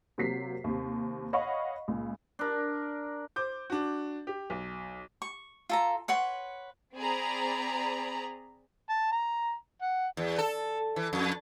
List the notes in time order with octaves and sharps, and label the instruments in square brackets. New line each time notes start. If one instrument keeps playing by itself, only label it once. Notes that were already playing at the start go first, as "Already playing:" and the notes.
[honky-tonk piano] C3 F#3 A#3 B6 C7
D#2 C3
C#5 D#5 F5 F#5 B5 C#6
C#2 A#2
[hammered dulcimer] D4 A#4
[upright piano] C5 D6 G6
D4 F#4
G4
B1
[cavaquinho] C#6
F4 A4 A#5
B4 C#5 F#5 C6
[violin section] C4 G#4 D5 A#5 B5
[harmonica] A5
A#5
F#5
[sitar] E2
A4
E3
F2